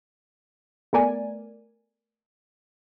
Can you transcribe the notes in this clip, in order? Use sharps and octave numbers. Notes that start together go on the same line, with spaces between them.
A3 B3 A#4 D5 G#5